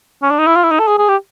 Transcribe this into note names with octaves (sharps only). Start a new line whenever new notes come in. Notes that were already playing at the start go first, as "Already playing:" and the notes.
C#4
D4
D#4
E4
F4
E4
D#4
A4
G#4
G#4
G4